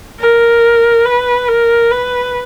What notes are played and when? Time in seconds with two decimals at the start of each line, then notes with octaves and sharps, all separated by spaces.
0.19 A#4
1.06 B4
1.48 A#4
1.91 B4